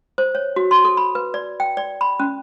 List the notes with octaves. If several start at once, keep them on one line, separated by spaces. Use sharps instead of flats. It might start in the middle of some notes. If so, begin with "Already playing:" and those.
C5
C#5
F#4
C6
A4
B5
B4
D5
G5
D5
B5
C#4